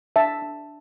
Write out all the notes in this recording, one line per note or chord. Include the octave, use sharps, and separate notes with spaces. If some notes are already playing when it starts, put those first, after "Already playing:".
D4 E5 A5
D4